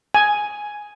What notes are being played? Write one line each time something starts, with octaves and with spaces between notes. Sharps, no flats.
G#5